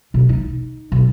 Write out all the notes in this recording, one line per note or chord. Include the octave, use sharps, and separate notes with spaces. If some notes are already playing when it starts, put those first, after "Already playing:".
B2
D#4
B1